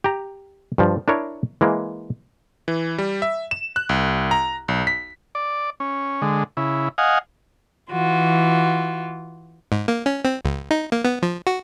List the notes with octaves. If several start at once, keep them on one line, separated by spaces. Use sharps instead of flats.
G4 A#5
G2 F3
D4 E4 A#4 C#5
E3 G#3 A#3
E3
G3
E5
E7
F#6
C2
A#5
B1
B6
D5
C#4
D3 G#3
C#3 E4
D#5 F5 F#5 G#5
E3 F4 F#4
G#2
A#3
C#4
C4
C#2
D#4
A#3
B3
F3
F#4